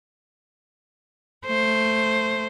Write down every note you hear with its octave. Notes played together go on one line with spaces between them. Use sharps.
A3 C5